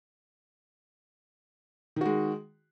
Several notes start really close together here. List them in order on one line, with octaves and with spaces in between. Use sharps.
D#3 F#4 G#3